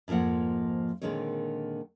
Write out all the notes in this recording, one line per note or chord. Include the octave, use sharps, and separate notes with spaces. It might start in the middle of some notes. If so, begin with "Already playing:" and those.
F2 G#2 F3 A#3 F#5
A#2 D3 D#3 G#3 C4 C#5